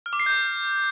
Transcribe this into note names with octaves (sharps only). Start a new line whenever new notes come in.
F6
D6
C7
G6